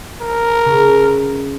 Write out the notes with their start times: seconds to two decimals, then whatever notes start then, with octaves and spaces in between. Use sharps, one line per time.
0.21 A#4
0.65 C#3